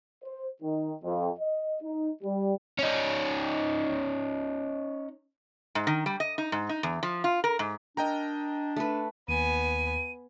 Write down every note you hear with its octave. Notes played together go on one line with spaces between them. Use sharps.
C5
D#3
F2
D#5
D#4
G3
C#4 D#4
G#2
D#3
G3
D#5
D#4
G#2
D#4
E2
F3
F4
A#4
G#2
D4 A#4 D#5 G5 A#5
A3 B4
D#2 B3 G#5 D#7